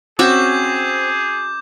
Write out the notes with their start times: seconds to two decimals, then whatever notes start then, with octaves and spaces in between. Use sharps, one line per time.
0.19 C4 C#4 F#4 G#4 E5 D6 G6